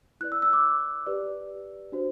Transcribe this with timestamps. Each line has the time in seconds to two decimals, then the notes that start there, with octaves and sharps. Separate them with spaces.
0.21 E4 B4 D5 F#6
0.32 E6
0.42 E6
0.53 D6
1.06 G4 B4 D5
1.92 D4 F#4 C5